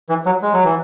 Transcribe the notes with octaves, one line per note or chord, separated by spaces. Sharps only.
E3
F#3
G#3
F#3
E3